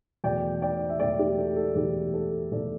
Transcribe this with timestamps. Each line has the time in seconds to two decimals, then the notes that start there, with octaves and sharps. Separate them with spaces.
0.24 E2 B2 A3 D5 G5
0.62 D5 G5
0.89 E5
1.00 E2 B2 A3 D5 G5
1.19 G4
1.38 A4
1.56 A4
1.75 E2 B2 A3 G4
2.14 A4
2.51 E2 B2 A3 A4 D5